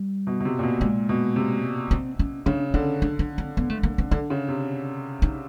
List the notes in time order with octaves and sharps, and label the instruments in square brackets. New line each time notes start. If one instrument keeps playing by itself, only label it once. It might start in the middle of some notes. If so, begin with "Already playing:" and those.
Already playing: [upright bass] G3
[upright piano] B2
B2
C3
A#2
B2
[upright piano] A#2 [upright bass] G#3
[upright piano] B2
C3
[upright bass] C4
C#4
[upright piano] C#3 [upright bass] D4
[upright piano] D3 [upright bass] C#4
[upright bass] D4
D4
C4
B3
A3
A#3
C4
[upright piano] D3 [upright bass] D4
[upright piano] C#3
C3
[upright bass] D#4